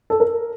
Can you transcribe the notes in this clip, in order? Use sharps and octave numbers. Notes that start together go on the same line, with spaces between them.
A4
A#4